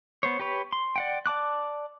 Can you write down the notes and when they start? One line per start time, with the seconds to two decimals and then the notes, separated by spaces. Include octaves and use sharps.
0.23 B3 C5 C#5
0.39 G4 B4 C#5
0.73 C6
0.96 D5 F#5 G5
1.26 D5 A5 D6 F#6